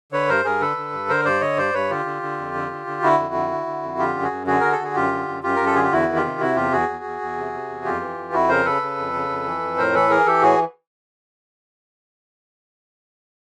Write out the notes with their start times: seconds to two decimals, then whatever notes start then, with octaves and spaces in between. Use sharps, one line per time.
0.12 D3 B4 C#5
0.29 G2 A#4 C5
0.44 G2 G#4 A#4
0.61 D3 A4 B4
0.77 D3
0.93 G2
1.09 D3 A#4 C5
1.25 G2 C5 D5
1.41 D3 C#5 D#5
1.57 G2 C5 D5
1.74 G2 B4 C#5
1.90 D3 F4 G4
2.06 D3
2.23 D3
2.38 F2
2.55 D3
2.71 D3
2.87 D3
3.02 D3 E4 F#4
3.19 F2
3.34 D3
3.51 D3
3.66 D3
3.83 F2
3.98 D3 F4 G4
4.15 F#2
4.22 F#4 G#4
4.31 F#2
4.47 D3 F#4 G#4
4.60 D3 A#4
4.72 A4
4.79 D3 G#4
4.95 F#2 F4 G4
5.12 D3
5.28 F#2
5.43 F#2 F4 G4
5.56 F#2 A#4
5.66 A4
5.75 D3 G#4
5.84 G4
5.92 E2 E4 F#4
6.09 D#3
6.16 F4 G4
6.25 C3
6.40 C3 E4 F#4
6.56 E2 F4 G4
6.72 E2 F#4 G#4
6.89 E2
7.04 E2
7.21 E2
7.37 C3
7.53 C3
7.69 E2
7.84 F2 F4 G4
8.01 E3
8.18 F2
8.33 F2 E4 F#4
8.49 C#3 A#4 C5
8.65 C#3 A4 B4
8.82 C#3
8.98 F2
9.13 C#3
9.29 F2
9.46 E3
9.62 F2
9.77 A2 A#4 C5
9.94 E3 A4 B4
10.10 E3 G#4 A#4
10.26 E3 G4 A4
10.42 A2 F#4 G#4